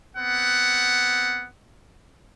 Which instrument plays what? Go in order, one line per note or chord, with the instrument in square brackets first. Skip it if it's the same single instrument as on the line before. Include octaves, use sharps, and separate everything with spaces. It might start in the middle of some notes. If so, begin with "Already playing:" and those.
[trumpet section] B3 C4 F#5